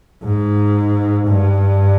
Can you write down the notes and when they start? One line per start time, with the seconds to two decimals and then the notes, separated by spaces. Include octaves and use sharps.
0.24 G#2
1.27 G2